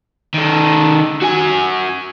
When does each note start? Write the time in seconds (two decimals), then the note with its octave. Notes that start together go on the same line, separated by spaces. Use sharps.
0.34 D#3 A4
1.22 F#4 G#5